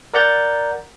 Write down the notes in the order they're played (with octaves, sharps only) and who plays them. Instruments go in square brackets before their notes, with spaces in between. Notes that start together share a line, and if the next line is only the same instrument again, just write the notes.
[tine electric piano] A#4 D5 F#5 A#5 G6 A6